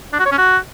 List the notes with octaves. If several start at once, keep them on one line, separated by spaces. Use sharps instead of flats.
D4
F#4
C#5
C#4
F#4